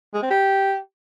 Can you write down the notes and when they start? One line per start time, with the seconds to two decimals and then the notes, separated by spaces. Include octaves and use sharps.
0.14 G#3
0.22 C4
0.30 G4